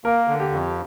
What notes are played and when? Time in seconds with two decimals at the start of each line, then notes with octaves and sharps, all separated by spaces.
0.05 A#3 A#4
0.28 D3
0.40 G4
0.51 F2